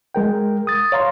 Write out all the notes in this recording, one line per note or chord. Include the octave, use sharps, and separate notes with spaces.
G#3 A#4 G5
D#6 A6
C#5 F5 A#5 C6